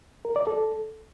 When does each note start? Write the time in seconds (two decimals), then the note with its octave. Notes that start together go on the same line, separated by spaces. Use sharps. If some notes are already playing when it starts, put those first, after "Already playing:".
0.25 A#4
0.36 D5
0.47 A4